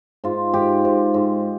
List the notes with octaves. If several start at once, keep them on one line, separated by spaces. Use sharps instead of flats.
G#2 F4
G#2 G4
G#2
G#2